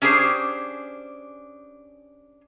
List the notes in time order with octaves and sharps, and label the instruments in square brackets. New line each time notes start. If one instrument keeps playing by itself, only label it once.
[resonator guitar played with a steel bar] C#4 D4 G4 G#4 C5